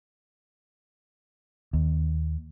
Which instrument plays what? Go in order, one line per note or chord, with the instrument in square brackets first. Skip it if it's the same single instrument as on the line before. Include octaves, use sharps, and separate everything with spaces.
[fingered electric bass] D#2